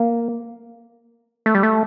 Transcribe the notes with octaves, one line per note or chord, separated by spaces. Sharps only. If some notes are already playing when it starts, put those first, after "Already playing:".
Already playing: A#3
A3
G3
A3